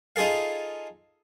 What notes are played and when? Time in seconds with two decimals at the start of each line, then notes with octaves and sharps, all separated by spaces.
0.16 D#4 F4 G#4 A4 F5